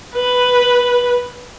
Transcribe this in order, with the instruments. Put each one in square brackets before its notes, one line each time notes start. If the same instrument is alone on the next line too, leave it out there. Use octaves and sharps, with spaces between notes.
[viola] B4